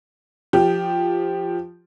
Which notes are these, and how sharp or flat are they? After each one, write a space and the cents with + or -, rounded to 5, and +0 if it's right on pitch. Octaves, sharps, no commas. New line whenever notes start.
F3 +0 G4 +0